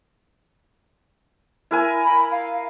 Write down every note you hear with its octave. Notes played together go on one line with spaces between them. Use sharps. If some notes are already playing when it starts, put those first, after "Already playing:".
E4 A#4 G#5
B5
F5